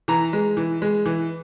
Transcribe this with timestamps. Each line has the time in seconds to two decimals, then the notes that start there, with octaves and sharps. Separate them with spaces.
0.08 E3 A#5
0.33 G#3
0.57 E3
0.82 G#3
1.06 E3